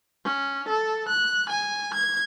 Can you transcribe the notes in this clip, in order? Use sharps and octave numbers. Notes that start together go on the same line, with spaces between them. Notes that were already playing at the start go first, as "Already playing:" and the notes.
C#4
A4
F#6
G#5
G#6